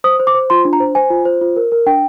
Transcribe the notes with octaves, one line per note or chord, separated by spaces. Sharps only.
C5 D#6
C5
D6
C5
F4 C6
D4
A#5
C5
C5 G#5
F4
C5
F4
A#4
A#4
D4 G5